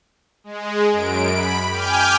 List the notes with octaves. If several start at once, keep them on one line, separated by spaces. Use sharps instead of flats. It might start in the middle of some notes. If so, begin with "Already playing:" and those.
G#3
F#2 D7
B5
G5 G#5 D6 F6 G6